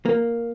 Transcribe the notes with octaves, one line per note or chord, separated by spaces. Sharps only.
A#3